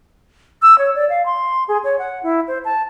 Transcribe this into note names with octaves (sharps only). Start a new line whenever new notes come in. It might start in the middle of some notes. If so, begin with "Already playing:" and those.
E6
C#5
D5
F5
C6
G#4
C#5
F#5
E4
C5
A5